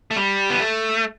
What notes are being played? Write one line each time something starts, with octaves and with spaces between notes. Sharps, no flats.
A3
G3
B3
A3